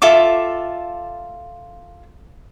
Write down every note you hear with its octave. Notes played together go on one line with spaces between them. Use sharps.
F4 A4 E5 D6